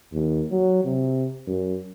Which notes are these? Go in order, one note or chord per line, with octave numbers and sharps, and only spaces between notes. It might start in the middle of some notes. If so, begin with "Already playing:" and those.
D#2
F#3
C3
F#2